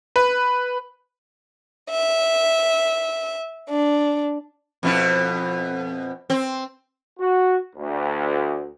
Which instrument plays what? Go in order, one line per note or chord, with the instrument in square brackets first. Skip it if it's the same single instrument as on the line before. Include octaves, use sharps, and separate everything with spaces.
[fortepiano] B4
[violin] E5
D4
[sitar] F2 B2 E4
C4
[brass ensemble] F#4
D2